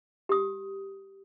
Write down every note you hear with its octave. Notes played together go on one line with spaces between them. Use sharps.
G4 D#6